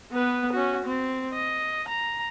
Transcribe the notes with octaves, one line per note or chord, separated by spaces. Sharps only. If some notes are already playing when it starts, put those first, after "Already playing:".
B3 B4
C#4 F#4
C4
D#5
A#5